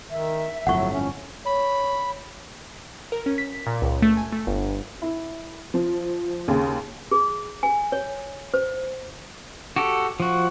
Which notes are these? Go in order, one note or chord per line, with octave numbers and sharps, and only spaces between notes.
D#3 E5
G1 F2 A2 F#3 F#5 C#6
C#4
C#5 B5
A#4
C#4
B6
A#2
C#2
A3
G#5
A3
G1
E4
F3
D#2 C#3
G#4
G#5
C#5
C5
F#4 G4 A4
F3 F#4